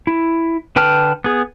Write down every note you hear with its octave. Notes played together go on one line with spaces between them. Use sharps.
E4
D3 B4 G5 A5 F6
B3 G#4